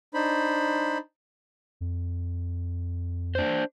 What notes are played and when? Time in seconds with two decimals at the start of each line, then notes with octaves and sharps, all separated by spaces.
0.14 D4 D#4 C5 B5
1.81 F2
3.35 D4 C5